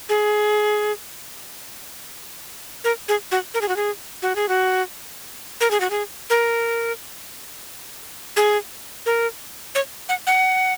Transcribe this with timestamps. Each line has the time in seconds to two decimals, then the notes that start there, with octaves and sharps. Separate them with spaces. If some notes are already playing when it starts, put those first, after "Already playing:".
0.09 G#4
2.84 A#4
3.08 G#4
3.31 F#4
3.54 A#4
3.61 G#4
3.69 F#4
3.76 G#4
4.22 F#4
4.36 G#4
4.49 F#4
5.61 A#4
5.71 G#4
5.80 F#4
5.90 G#4
6.30 A#4
8.37 G#4
9.06 A#4
9.75 C#5
10.09 F#5
10.27 F#5